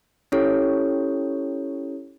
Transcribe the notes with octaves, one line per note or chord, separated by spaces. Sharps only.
C#4 E4 G4 A4 C#5